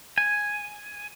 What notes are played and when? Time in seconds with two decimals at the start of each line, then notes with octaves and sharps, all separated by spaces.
0.18 G#5